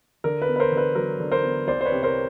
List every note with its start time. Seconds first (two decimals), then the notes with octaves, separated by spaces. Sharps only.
0.24 D3 A#4
0.42 B4
0.48 B3
0.56 B4
0.60 A#4 C5
0.72 D3
0.77 B4
0.95 F#3 A#4
1.20 D3
1.31 A#4 C5
1.43 B3
1.67 C2 C5 D5
1.81 C5
1.86 B4 C#5
1.92 C3
2.03 A#4 C5